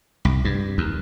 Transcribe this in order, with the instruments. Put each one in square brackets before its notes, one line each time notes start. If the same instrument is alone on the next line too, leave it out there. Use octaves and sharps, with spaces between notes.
[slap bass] C2
G2
D#2